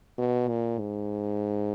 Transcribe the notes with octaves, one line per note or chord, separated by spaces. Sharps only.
B2
A#2
G#2